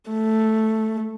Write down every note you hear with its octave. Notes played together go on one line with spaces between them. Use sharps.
A3